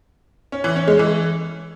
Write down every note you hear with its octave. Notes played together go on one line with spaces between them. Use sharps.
C#4
E3
C#4
G#3
E3